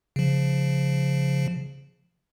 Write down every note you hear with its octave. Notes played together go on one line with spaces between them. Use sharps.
C#3 F3